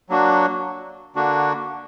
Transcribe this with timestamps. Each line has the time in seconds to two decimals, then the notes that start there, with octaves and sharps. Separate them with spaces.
0.09 F#3 A#3 D4 F#4
1.16 D3 A#3 D4 F#4